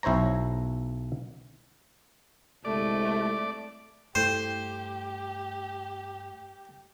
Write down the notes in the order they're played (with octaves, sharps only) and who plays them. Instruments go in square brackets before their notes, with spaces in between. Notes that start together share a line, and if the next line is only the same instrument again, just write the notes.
[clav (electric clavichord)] B1 E4 C5 C#5 A#5
[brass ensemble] G1 C2 [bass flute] G#3 [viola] A3 A4 [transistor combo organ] D5
[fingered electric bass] G2 A3 [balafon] E4 A4 G5 [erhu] G4 [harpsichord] C5